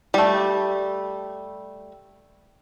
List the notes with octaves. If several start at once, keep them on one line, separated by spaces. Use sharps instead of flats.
G3 A3